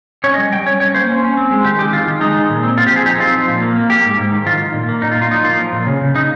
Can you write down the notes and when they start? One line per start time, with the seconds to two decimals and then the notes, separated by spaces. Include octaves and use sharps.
0.24 C#4 C#5
0.34 D#5
0.38 G3
0.53 G3 G5
0.66 C#4 C#5
0.80 C#4 C#5
0.94 A#3 C5
1.09 C#4
1.23 C#4
1.37 C4
1.51 G#3
1.64 D#3 G4
1.79 G#3 G4
1.93 D#3 F4
2.07 D#3
2.21 G#3 D#4
2.36 D#3
2.50 A#2
2.63 C4
2.78 C4 F4
2.87 G4
2.91 F3 G#4
3.06 D#4 G4
3.20 C4 F4
3.34 F3
3.48 A#2
3.62 A#3
3.75 A#3
3.90 A#3 G4
4.05 G#2
4.18 G#2
4.32 D#3
4.46 D#3 F4
4.61 D#3
4.74 A#2
4.89 A#3
5.02 A#2 D#4
5.12 F4
5.16 A#2
5.22 F4
5.31 F3 D#4
5.44 A#3 F4
5.59 F3
5.72 A#2
5.87 C#3
6.01 C#3
6.15 C#3 D#4